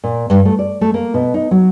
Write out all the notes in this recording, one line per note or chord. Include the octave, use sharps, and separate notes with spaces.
A#2
G2
A3
D5
A3
A#3
B2
D#4
F#3